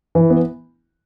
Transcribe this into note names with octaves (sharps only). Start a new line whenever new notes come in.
E3
B3